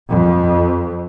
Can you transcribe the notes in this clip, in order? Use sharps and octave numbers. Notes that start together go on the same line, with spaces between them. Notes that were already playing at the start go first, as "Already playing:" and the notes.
F2